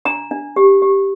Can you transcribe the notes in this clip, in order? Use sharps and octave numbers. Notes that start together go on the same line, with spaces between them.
D4 A#5
D4
G4
G4